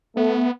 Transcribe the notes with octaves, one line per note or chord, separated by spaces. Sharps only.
A3 B3